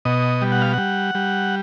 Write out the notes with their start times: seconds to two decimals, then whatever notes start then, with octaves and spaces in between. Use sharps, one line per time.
0.05 B2 D#5
0.42 G3
0.52 F#5
0.62 F5
0.73 G3 F#5
1.15 G3